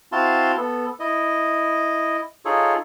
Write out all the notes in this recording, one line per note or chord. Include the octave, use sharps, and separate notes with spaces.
C4 E4 F#4 F5 A5 C6
B3 A4
E4 D#5
D#4 F4 G#4 A4 C#5